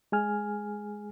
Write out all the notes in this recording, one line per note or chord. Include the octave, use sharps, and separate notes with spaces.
G#3 G#4 G#5 F6